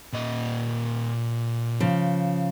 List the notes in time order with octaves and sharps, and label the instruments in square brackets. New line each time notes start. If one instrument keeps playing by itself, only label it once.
[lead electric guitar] A#2 D#5
[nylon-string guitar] C#3 F3